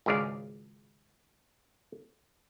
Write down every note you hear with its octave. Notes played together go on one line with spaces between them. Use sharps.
G#1 C#2 G#4 D5 F5